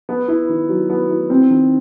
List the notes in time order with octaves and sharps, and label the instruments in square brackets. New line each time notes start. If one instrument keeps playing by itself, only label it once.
[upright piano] B3
E4
D#3
F#3
B3
E4
C4
D#3